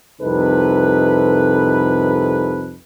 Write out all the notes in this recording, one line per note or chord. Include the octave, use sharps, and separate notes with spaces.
C2 F2 C3 D#4 A4 B4